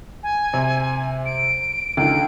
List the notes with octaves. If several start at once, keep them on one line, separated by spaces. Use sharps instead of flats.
G#5
C3
D7
C#2 D3 D#3 D7